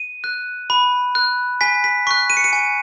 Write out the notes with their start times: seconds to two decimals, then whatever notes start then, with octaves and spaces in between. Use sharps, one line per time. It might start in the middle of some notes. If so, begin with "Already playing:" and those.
Already playing: D#7
0.24 F#6
0.70 B5
1.15 F#6
1.61 G#5 B6
1.84 B6
2.07 C#6 F#6 B6
2.30 D#7
2.37 C#7
2.44 D#7
2.53 G#5